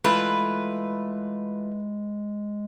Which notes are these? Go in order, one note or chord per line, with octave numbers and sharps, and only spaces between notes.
E3 G#3 A3 F4 B4